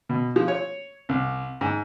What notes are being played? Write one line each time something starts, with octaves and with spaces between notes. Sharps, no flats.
B2
F3
C#5
C2
G#2